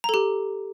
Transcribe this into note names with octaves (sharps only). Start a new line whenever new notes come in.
G4 A4 A#5